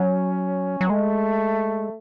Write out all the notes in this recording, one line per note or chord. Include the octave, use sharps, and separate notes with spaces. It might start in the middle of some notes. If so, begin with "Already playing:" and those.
Already playing: F#3 C#4
F#3
G#3 A3